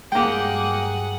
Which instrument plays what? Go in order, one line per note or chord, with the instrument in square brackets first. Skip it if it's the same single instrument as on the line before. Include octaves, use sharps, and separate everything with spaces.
[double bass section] G2 F#3 [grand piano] G#3 A#3 [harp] G4 G5 [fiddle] G#4 F#5